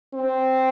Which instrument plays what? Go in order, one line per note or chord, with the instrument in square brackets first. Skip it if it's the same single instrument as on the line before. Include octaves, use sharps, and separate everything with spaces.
[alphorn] C4